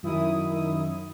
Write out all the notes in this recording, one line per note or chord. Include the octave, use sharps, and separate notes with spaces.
F#2 D#3 E4 D#6